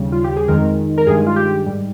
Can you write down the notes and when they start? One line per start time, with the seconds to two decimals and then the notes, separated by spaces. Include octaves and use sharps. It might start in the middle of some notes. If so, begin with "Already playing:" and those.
Already playing: D#2 C#3 G3
0.12 F4
0.24 G4
0.37 G#4
0.48 F2 D#3 G#3 A#4
0.98 A#4
1.07 G2 D#3 G#3 G#4
1.26 F4
1.36 G4
1.66 G#2 G3